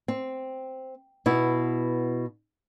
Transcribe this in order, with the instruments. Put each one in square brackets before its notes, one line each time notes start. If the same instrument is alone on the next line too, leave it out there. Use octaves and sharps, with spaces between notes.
[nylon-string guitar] C4
B2 B3 E4